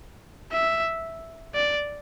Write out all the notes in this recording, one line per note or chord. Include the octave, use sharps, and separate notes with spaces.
E5
D5